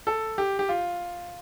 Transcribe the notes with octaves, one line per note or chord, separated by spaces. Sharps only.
A4
G4
G4
F4